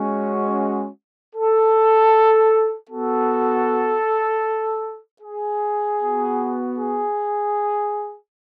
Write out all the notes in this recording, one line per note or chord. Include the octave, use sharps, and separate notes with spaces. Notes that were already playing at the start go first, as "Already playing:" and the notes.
Already playing: G#3 C#4 F#4
A4
B3 F#4 A4
G#4
B3 F#4
G#4